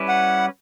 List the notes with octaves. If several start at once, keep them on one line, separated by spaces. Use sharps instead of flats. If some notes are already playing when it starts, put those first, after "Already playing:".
Already playing: G3 C#4 E4 B4
F#5